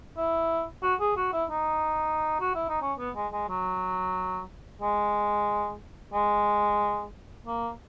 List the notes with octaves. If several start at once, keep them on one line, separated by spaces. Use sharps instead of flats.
E4
F#4
G#4
F#4
E4
D#4
F#4
E4
D#4
C#4
B3
G#3
G#3
F#3
G#3
G#3
A#3